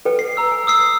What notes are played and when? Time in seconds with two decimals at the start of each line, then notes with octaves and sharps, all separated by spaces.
0.05 A4 B4 G5
0.19 C7
0.37 A#5 E6
0.52 G#5
0.67 D#6 E6 C7